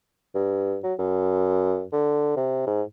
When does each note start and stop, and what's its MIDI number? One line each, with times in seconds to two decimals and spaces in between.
0.35 0.79 43
0.83 0.94 54
0.99 1.85 42
1.92 2.33 50
2.36 2.64 48
2.67 2.82 44